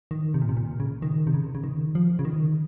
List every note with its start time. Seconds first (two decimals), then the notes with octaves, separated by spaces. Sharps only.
0.11 D#3
0.34 C3
0.42 A#2
0.49 C3
0.57 A#2
0.80 C#3
1.02 D#3
1.27 C3
1.34 C#3
1.55 C#3
1.64 D#3
1.95 F3
2.19 C#3
2.25 D#3